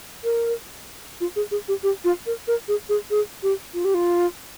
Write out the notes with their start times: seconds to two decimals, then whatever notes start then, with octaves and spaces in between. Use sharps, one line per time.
0.24 A#4
1.21 F4
1.36 G#4
1.51 G#4
1.68 G4
1.83 G4
2.05 F4
2.26 A#4
2.48 A#4
2.68 G#4
2.89 G#4
3.10 G#4
3.43 G4
3.74 F4
3.85 G4
3.94 F4